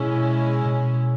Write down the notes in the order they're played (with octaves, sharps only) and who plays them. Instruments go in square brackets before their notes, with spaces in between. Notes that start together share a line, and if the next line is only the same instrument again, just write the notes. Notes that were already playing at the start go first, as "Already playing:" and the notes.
Already playing: [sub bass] B2 [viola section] G#3 C#4 E4
[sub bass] B2